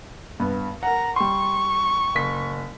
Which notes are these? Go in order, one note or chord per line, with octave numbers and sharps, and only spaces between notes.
G2 B3
A#4 F#5 A#5
G3 C6 C#6
F#1 B6